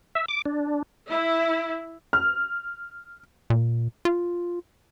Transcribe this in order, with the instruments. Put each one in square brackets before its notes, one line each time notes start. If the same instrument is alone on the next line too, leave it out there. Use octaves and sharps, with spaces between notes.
[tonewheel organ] E5
D6
D4
[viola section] E4
[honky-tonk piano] F6
[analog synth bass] A#2
F4